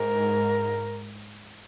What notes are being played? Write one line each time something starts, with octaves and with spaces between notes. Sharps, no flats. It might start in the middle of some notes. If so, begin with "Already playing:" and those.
Already playing: G#2 A#4